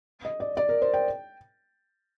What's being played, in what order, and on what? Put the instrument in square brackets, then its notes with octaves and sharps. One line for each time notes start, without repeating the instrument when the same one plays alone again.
[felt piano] D#5
D5
D5
A#4
C5
G5